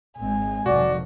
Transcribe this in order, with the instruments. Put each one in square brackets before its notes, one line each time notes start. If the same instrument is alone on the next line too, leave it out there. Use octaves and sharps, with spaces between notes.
[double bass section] G#1 G#3 C4 [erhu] G#5
[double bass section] F1 D#3 F3 [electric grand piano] F#4 [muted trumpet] D5